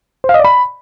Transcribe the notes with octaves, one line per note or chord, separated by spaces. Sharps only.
C5
F5
D#5
D5
B5